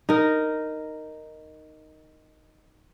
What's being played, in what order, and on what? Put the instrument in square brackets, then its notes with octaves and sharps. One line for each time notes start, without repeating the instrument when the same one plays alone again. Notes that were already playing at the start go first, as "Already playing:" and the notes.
[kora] D#4 A#4